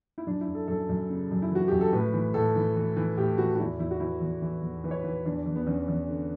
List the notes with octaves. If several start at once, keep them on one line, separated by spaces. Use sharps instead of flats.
E4
F#2 D4
E4
F#2
A4
F#2 A4
F#2
C#3
F#2
E4
E3 F#4
F#2 G4
A4
A2 B4
E3
A2 A4
E3
E3
E3
A2 G4
E3 F#4
F#4
E2 E4
E2 E4
F#4
E3 E4
E2
E3
E2
E3 B4
C#5
E3 B4
E2 D4
E2
B3
E2 C#4
E2
D3